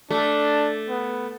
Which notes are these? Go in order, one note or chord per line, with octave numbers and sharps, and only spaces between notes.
A3 D4
B3